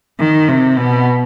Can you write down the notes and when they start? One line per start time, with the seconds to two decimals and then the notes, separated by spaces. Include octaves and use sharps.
0.19 D#3
0.48 C3
0.78 B2